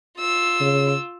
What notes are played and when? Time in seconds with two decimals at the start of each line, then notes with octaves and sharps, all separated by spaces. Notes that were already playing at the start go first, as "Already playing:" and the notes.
0.19 F4 E6
0.61 C#3